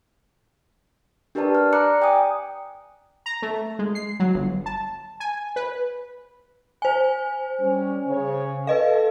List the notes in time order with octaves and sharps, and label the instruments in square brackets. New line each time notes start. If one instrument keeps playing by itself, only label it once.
[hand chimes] D4 G4 A#4 B4 D5 A5
F6
D5 A#5 D6 F#6 C#7
G5 G#5 D#6
[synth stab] A#5
A3
G#3
C7
F#3
G1
A5
G#5
B4
[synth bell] C5 G#5
[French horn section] G3 C#4
C#3 C#5
[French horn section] A4 [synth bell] B4 D#5 F5